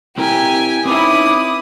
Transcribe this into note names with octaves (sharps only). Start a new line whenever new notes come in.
C4 E4 G4 A#4 G#5
C4 C#4 D#4 E4 B4 D6 D#6